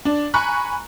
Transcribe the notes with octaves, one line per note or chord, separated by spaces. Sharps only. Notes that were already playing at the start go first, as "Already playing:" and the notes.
D4
G#5 A#5 B5 C#6 F#6